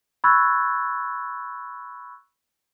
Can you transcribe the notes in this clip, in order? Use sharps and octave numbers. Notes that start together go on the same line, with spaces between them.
B5 C#6 E6 F#6 G#6 A6